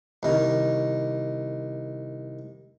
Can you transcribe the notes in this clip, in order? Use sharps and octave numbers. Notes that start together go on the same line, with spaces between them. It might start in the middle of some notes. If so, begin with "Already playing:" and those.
C2 D#3